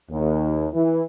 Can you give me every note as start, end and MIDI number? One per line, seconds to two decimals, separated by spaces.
0.11 0.67 39
0.74 1.02 52